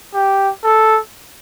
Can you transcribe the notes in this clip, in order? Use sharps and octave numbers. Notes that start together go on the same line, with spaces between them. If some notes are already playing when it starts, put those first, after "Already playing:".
G4
A4